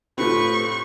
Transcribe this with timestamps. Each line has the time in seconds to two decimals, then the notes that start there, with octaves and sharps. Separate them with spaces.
0.18 A2 C4 F4 G4 A4 B4 C#6